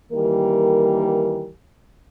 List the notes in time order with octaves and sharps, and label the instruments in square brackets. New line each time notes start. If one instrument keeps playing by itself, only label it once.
[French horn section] D#3 E3 G3 A#3 A#4